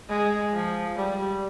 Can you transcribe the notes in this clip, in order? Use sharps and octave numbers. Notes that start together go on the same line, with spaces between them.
G#3
F3
G3